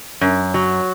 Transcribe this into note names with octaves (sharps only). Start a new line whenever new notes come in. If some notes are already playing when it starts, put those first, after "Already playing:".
F#2
F#3